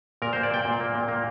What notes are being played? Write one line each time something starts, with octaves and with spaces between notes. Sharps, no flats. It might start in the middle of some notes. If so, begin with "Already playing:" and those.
A#2 A#4
A#3 C5
D5
A#2 G5
A#2
A#3
A#2
A#3